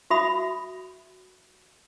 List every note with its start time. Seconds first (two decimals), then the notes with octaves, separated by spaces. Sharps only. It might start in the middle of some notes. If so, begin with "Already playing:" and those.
0.10 F#4 E5 B5 D#6